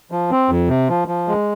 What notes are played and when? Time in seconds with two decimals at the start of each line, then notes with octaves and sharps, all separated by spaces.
0.11 F3
0.31 C4
0.49 F2
0.69 C3
0.89 F3
1.08 F3
1.28 G#3